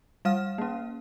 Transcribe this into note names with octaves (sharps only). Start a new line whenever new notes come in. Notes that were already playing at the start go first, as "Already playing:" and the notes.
G3 F5 F6
A#3 C#4